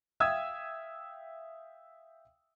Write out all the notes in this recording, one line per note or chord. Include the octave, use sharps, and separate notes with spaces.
E5 F5 G5 D#6 E6 G#6